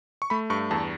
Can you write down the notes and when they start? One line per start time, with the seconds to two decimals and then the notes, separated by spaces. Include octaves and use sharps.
0.22 C#6
0.30 A3 B5
0.50 G2 C#6
0.71 E2 A5